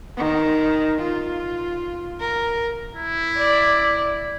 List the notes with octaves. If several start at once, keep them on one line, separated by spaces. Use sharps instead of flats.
D#3
F4
A#4
E4
D5